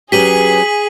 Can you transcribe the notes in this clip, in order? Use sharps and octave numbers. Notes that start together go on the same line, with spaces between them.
F#3 C#4 G4 G#4 B4 B6 D#7 F#7